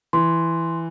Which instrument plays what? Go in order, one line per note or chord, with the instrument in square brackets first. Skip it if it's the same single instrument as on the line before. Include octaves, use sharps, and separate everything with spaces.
[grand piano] E3 [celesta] C6